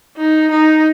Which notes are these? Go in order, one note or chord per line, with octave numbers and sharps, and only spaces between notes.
D#4
D#4